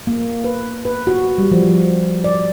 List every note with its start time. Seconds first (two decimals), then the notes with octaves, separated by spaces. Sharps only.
0.07 A#3
0.44 B4
0.85 B4
1.07 F#4
1.38 G3
1.52 F3
2.24 D5